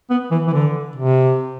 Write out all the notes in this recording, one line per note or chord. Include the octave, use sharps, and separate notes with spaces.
B3
E3
E3
D3
C3